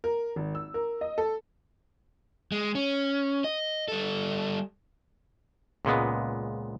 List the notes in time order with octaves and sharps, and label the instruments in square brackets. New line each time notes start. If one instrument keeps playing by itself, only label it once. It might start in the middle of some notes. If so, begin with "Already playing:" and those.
[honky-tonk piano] A#4
G#1
E6
A#4
D#5
A4
[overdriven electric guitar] G#3
C#4
D#5
G3 A4
[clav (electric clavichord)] C#2 A#2 G#3 B3